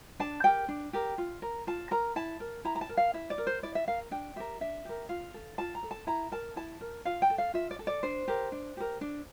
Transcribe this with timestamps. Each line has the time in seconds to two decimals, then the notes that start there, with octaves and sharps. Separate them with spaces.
0.20 D4 A5
0.44 G4 A#4 G5
0.68 D4
0.93 G4 A#4
1.18 F4
1.42 A#4
1.67 F4 A5
1.91 A#4 A#5
2.16 E4 A5
2.40 A#4
2.65 E4 A#5
2.75 A#5
2.81 A5
2.89 A#4
2.97 F5
3.14 E4 E5
3.30 D5
3.38 A#4
3.47 C5
3.63 E4 D5
3.75 E5
3.87 A#4 F5
4.11 D4 G5
4.36 G4 A#4 E5
4.61 D4 E5
4.85 G4 A#4
5.09 F4 F5
5.34 A4
5.58 F4 A5
5.75 A#5
5.83 A4
5.91 A5
6.07 E4 A#5
6.32 A#4 A5
6.56 E4 A5
6.81 A#4
7.05 F4 F5
7.22 G5
7.30 A4
7.38 F5
7.54 F4 E5
7.71 D5
7.79 A4
7.87 D5
8.03 D4 C5
8.28 G4 A#4
8.52 D4
8.77 G4 A#4
9.01 D4